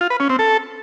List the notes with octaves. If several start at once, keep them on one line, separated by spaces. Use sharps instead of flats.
F4
B4
C#4
C4
A4